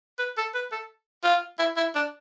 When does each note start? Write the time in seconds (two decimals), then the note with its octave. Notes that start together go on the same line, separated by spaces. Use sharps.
0.19 B4
0.37 A4
0.55 B4
0.72 A4
1.24 F4
1.59 E4
1.77 E4
1.95 D4